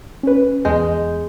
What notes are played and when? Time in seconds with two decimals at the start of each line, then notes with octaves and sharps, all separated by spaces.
0.23 C#4 B4
0.65 E2 G#3 G6